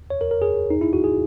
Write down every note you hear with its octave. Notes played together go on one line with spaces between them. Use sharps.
C#5
A#4
A#4
G#4
D#4
E4
F#4
G#4